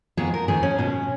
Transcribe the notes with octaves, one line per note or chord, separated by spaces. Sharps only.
F2 D#3 G#3 B3 G#4
A#4
F2 D#3 G#3 B3 G#4
C#4
B2 G#3 B3